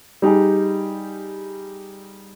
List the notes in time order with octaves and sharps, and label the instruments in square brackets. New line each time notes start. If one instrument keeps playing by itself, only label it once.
[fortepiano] G3 D#4 G4 G#4